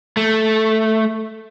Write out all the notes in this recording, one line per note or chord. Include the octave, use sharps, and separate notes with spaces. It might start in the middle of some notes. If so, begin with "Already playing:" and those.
A3